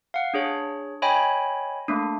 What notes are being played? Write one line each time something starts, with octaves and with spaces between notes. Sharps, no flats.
F5 F#5
D4 G#4 C#5
C#5 D#5 G5 G#5 B5
A3 A#3 D4